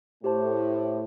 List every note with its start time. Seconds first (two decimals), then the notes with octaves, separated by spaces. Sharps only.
0.24 A2 G4 C5 A5